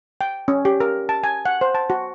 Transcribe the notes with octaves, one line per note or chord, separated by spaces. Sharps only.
G5
C#4
G4
A#4
A5
G#5
F#5
C5
A5
F#4